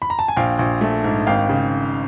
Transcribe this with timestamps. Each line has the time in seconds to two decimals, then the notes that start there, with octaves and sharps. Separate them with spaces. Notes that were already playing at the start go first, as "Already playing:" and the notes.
0.02 B5
0.10 A#5
0.19 A5
0.28 G#5
0.37 A#1 F5 G5
0.59 A#1
0.81 A3
1.04 G#2
1.27 G#1 F5 G5
1.49 C#3